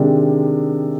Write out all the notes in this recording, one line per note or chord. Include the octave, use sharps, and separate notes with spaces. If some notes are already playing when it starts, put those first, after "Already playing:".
Already playing: C3 D#3 G#3 D4